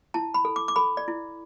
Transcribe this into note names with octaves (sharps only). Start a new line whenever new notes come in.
E4 A5
B5
A4
D6
D6
A4 B5
D5
E4